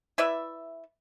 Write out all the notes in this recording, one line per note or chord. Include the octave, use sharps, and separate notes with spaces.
E4 B4 D5 E5